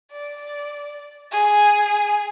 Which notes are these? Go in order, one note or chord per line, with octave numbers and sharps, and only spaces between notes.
D5
G#4